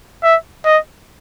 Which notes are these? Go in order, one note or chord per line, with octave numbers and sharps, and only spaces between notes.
E5
D#5